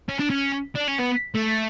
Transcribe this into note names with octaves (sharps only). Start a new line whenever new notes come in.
C#4
D4
C#4
D4
C#4
B3
A3